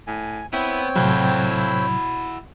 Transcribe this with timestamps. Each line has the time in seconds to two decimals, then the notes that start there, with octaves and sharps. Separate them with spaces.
0.07 A2 G#5
0.53 B3 C4 E4 C#5 G5
0.96 F2 A2 C3 F#3 E4 F#4